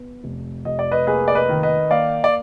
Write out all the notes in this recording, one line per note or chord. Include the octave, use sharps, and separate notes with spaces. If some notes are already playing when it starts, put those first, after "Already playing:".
Already playing: B3
F1
F1 D#5
D5
B4 D#5
A#3 G#4 B4
D5
B4 D#5
D#3
B4 D#5
A#3 D5 F5
D5